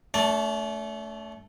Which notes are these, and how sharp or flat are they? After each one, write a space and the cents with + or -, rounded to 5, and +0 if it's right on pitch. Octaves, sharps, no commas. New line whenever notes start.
A3 +0 D4 -45 A5 +0